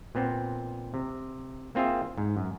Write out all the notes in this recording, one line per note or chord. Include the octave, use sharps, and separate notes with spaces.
A#2 B3 C4
C3
A#3 C4 F4 G#4 E5
G#2
F#2